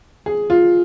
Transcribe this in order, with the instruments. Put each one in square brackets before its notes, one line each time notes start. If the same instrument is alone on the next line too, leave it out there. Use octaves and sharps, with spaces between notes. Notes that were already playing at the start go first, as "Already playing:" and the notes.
[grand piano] G#4
F4